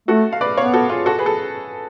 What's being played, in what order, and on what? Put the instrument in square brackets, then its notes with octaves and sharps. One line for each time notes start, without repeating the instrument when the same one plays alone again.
[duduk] A3 [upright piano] F#4 A4
[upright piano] F5
B4 D5
[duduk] B3 [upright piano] C#5 F5
[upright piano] F#4 A4
F4 G#4
F#4 A4
G#4 B4
A4